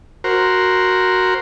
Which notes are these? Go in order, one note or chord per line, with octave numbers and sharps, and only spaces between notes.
F#4 A#4 C5